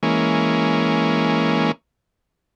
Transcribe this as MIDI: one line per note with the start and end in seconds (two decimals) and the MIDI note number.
0.03 1.72 52
0.03 1.72 56
0.03 1.72 58
0.03 1.72 61